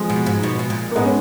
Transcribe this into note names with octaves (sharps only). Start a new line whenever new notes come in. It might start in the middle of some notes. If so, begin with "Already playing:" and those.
Already playing: F3 G#3
B2
G#2
B2
B2
A#2
A#3
G#2 G#3 B3
C#4